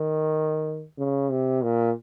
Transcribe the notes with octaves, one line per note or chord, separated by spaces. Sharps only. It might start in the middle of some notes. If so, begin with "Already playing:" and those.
Already playing: D#3
C#3
C3
A#2